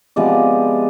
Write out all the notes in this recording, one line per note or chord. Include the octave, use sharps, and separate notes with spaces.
C3 F3 G#3 B3 D5 F5